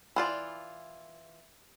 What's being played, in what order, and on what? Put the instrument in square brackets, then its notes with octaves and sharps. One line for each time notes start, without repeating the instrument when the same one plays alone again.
[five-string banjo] E3 F4 D5